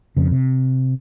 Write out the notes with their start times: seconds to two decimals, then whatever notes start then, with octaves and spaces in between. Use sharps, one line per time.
0.17 F2 C#3
0.32 C3